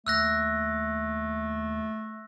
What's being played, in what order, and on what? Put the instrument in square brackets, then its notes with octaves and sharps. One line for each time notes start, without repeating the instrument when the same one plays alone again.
[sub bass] D#2 [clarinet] A3 [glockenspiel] E6 F#6 A#6